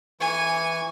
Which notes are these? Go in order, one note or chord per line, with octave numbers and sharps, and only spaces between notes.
E3 G#5 C#6